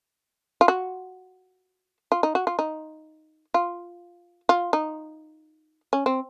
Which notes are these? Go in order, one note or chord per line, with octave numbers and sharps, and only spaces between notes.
F4
F#4
F4
D#4
F#4
F4
D#4
F4
F4
D#4
C#4
C4